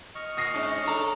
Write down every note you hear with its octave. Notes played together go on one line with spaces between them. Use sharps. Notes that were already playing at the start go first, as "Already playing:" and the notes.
D#5 C#6 F6
A#2 D#6 A#6 C7
G#2 C#4 D4
D4 A4 D5 A#5